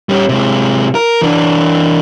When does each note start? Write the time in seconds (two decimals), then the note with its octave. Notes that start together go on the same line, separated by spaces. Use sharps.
0.09 G3 C#4
0.29 C3 G#3
0.95 A#4
1.22 E3 D4